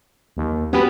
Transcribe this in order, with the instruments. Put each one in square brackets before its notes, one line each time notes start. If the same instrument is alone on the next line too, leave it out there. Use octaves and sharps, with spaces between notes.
[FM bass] D#2
[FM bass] B3 [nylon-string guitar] C#4 F#4 G4